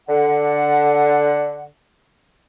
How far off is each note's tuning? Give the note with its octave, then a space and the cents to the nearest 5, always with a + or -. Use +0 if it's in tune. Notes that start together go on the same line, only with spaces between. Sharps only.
D3 +0 F#5 +0